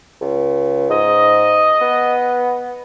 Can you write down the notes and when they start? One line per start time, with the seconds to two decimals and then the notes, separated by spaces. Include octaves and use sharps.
0.21 C#2
0.90 G#2 D#5
1.81 B3